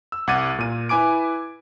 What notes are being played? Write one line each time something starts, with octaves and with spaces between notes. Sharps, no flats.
E6
C2 F#5 D6 G#6 A6 D#7
A#2 A#4 D#7
E4 B4 G#5 D6 D7